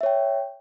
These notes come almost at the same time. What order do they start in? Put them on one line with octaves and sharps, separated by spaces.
E5 C#5 G5